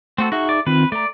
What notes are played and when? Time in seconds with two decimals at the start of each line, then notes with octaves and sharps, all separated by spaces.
0.18 A3 C4 F#4 A4
0.32 D#4 F#4 G#4 E5
0.49 D5
0.66 D#3 C4 F4 B4
0.92 A3 D5 A#5